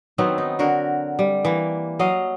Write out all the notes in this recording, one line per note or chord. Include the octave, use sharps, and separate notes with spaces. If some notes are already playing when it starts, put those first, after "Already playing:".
D#3 F#3 B3 C4
D#4
D3 F#4 A#4
G3
E3 A#3
F#3 D#5 F5